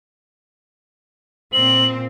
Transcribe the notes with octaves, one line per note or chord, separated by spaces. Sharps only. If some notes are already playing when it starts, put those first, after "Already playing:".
A#2 C4 F#7